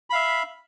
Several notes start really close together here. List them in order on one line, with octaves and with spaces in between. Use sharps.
B5 F5 E5